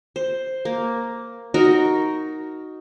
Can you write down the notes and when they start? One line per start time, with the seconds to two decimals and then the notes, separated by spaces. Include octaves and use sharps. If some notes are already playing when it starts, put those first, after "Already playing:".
0.16 C5
0.65 A#3
1.54 D#4 F#4 A#4